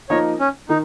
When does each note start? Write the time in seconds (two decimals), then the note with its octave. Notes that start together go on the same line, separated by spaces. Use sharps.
0.09 F3 A#3 D#4 A#4 C#5 D#5
0.40 C#4
0.69 D#3 D#4